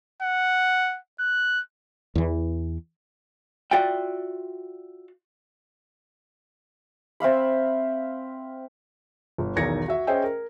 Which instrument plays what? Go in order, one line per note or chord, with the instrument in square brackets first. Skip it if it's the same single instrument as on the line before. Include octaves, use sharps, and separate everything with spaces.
[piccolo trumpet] F#5
F#6
[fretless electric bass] E2 E3
[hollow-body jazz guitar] F4 F#4 D5 E5 G5
[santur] C4 E5 F5 B5
[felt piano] G1
B1 E2 D#3 G#6 A#6 C#7
F#4 E5
C#4 G#4 C5 D#5 E5 G5
A#4